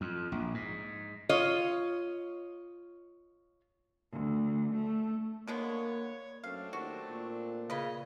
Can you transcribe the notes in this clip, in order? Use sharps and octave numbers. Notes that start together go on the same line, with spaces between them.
F2
A#1
G#2
F4 C#5 D#5
D2
A3
D3 G#3 A#3 B3 C#5
F#2 A3 C4 D4 F5
D#2 F#4
A#2
C#3 B4 D#5